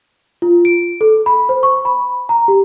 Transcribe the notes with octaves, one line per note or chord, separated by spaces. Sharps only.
F4
D7
A4
B5
C5
C#6
B5
A#5
G4